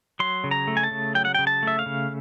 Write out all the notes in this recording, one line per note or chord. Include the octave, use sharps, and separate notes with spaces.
F#3 C6
C#3
A#5
A3
G#5
A5
C#3
F#3 G5
F#5
C#3 G5
A5
A3 E5
F5
C#3